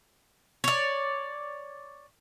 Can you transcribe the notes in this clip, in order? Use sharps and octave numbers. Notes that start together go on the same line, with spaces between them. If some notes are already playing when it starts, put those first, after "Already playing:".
C#5 D5